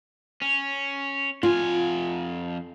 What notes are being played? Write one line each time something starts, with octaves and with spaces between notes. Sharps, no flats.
C#4
F2 F4 G#5